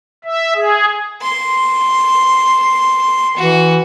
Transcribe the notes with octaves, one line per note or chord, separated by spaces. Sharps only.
E5
G#4
C6
E3 F#4